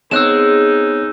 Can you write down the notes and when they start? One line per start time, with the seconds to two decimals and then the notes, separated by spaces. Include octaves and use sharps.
0.11 G#3 B3 C4 D#4 C#5 E6 F#6 E7